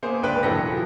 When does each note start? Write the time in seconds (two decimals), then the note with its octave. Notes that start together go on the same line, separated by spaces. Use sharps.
0.03 A#3 B3 G#4 C5
0.23 G1 C#2 D4 B4 G5 F#6
0.43 E1 E3 F#3 A4 A#6
0.69 F3 F#3